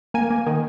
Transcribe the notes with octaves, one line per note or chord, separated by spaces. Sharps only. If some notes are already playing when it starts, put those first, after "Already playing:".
A#3 G#5
A#3
D#3